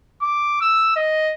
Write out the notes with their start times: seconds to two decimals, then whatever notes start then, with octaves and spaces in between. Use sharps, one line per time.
0.22 D6
0.61 E6
0.96 D#5